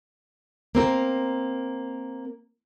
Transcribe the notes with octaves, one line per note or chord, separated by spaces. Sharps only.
A#3 C4 A#4